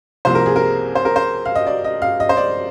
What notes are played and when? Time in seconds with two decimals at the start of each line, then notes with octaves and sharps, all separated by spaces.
0.25 C2 C3 F3 A#3 C5
0.35 A#4
0.46 G#4
0.56 A#4
0.95 C5
1.05 A#4
1.16 C5
1.45 F5
1.55 D#5
1.67 D5
1.84 D#5
2.02 F5
2.20 D#5
2.29 C5
2.37 D5